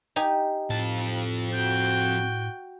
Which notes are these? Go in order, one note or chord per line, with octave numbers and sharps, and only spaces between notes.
D#4 G4 G#5
F2 A2 A5
F#4 G5